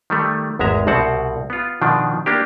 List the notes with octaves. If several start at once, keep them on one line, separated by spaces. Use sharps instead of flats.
D#3 G3 A3
G#1 E2 G#3 E5 A#5
C2 B2 C4 F#5 A5
B3 F4
B2 D#3 F3 D4
A#3 D4 G4